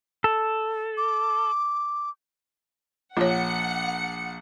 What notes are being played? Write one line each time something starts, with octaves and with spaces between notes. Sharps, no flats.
A4
D6
A#1 F4 C#5 F#5 C#7